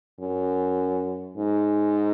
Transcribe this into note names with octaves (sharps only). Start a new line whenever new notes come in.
F#2
G#2